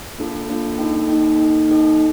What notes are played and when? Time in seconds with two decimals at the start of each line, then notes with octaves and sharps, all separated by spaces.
0.18 A#3 D4 F4 A4
0.49 A#3 D4 F4 A4
0.78 A#3 D#4 A4 D#5 G5
1.08 A#3 D#4 A4 D#5 G5
1.38 A#3 D#4 A4 D#5 G5
1.69 A#3 D#4 A4 D#5 G5